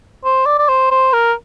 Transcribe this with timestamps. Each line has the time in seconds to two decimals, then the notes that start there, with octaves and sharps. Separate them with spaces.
0.25 C5
0.46 D5
0.59 D5
0.69 C5
0.91 C5
1.13 A#4